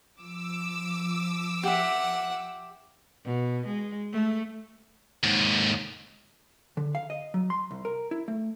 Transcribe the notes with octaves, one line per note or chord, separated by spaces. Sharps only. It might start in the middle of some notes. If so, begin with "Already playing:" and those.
F3 D6 E6
G4 E5 F#5
B2
G#3
A3
D#2 G#2
D3
F5
D#5
F#3
C6
C2
A#4
E4
A3